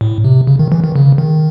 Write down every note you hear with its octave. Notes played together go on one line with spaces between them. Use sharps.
A2
C3
C#3
D#3
E3
D#3
C#3
D#3